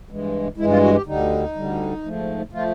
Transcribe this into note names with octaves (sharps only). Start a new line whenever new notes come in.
G2 E3 G#3
G2 E3 G#3 E4
F4
F#4
G4
D2 D3 G3 D#4
D2 D3 G3
G#2 F3 A3
F3 A3 F4